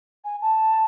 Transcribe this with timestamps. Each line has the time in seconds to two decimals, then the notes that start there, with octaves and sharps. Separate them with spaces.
0.24 G#5
0.42 A5